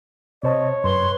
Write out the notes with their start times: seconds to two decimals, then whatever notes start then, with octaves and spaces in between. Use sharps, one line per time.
0.43 C3 C5 C#5 D#5 A5
0.84 F#2 B4 C6